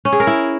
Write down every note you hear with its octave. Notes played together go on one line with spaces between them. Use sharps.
C#4
G#4
A#4
E4